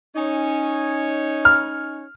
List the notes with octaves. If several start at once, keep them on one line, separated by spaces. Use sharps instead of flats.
C#4 D#4 C#5
F6